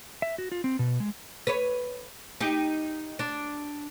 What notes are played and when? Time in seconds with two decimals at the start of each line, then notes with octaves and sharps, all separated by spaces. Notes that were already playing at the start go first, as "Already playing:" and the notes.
0.22 E5
0.38 F#4
0.52 F4
0.64 C4
0.79 B2
1.00 G#3
1.47 B4 C#5
2.41 D#4 G4
3.19 D4